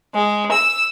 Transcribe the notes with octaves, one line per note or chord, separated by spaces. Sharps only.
G#3
E6